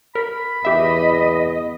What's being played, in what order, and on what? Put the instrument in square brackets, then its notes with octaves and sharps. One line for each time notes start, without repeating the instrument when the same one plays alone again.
[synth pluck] A#4 [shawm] B5
[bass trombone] E2 [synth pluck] G4 E5 [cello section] D#5